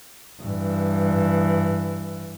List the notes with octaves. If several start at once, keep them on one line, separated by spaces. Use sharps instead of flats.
G2 E3